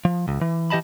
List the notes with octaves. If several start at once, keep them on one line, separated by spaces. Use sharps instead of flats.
F3
C#2
E3
E3 G4 D#5 A5 B5